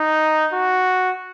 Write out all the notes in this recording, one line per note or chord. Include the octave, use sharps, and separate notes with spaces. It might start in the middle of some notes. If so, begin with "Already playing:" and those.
Already playing: D#4
F#4